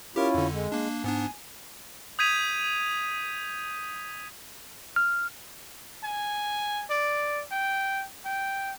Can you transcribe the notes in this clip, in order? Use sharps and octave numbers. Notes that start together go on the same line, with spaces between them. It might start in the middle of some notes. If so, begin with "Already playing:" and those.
C#4 E4 F4 G4 A#4
F2 D3
G#3
A#3 D4
G#2 B3 D4 G#5
D#6 G6 G#6 B6 D#7 F7
F6
G#5
D5
G5
G5